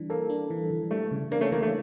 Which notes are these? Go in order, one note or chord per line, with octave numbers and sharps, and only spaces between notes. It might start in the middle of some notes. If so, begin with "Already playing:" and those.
Already playing: E3 G3 D4
A#3 A4
D4
E3
E3
G3 A3
C#3
A#3 D4
A3 C#4
E3 A#3
A3